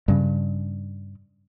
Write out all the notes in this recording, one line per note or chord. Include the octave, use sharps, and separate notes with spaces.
G2 C#3